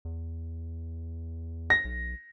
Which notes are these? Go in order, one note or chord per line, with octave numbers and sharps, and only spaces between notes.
E2
A#6
B1